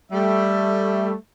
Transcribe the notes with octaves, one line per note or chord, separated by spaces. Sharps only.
G3 A3 E5